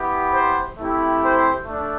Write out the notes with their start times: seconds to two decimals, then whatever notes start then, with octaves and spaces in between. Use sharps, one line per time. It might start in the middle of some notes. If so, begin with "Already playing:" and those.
Already playing: B3 E4 G4
0.33 C5
0.78 A3 C4 E4 G4
1.21 C5
1.66 A3 D4